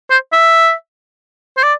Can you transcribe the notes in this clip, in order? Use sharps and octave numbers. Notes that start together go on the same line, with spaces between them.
C5
E5
C5
D5